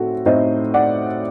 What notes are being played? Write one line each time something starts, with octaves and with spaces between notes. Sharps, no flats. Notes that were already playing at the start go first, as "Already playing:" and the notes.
Already playing: A2 C4 D#4 F#4 A4
A2 A3 C4 D#4 C5 D#5
D5 F#5